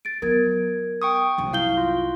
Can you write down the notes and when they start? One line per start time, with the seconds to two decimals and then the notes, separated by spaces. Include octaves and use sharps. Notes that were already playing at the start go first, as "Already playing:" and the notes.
0.05 A6 D7
0.22 F#3 B3 A#4 G#6
1.02 G5 C#6 D#6
1.38 C2 F#2
1.53 E4 F5 G6 G7
1.77 F4